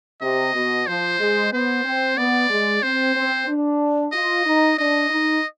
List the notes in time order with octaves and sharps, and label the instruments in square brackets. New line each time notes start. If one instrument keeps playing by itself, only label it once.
[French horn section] C3 [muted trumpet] D#5
[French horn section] B2
[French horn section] F3 [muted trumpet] C5
[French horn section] G#3
[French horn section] B3 [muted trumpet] C5
[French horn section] C4
[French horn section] B3 [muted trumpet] D5
[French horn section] G#3
[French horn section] C4 [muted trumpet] C5
[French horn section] C4
D4
[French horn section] F4 [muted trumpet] D#5
[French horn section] D#4
[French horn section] D4 [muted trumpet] D#5
[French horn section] D#4